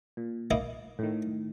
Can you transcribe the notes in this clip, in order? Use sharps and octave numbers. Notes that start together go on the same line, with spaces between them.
A#2
A#3 D#4 E4
A2 D#3